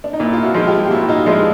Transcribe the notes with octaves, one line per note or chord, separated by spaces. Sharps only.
D4
D#4
A#2 E4
F4
E4 F#4
F3 G#3
F4 G4
G4
A#2 E4 F#4
D#4 F4
F3 G#3 D4 E4